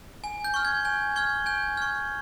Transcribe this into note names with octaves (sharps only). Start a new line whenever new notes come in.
G#5
G6
C#6 F6
G#6
G#5 G6
C#6 F6 G#6
G#5 G6
C#6 F6 G#6